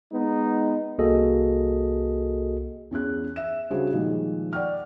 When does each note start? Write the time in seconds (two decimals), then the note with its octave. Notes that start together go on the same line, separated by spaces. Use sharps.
0.12 G#3 B3 D#4
0.99 C2 A#3 F#4 G#4 A4 D#5
2.91 E2 C#4 G#4 F#6
3.36 E5 E7
3.70 C#3 G3 D4 F#4 G#4 C5
3.92 A#2 D#3 F3 G3 G#3
4.53 D5 F#5 G5 C#6 F6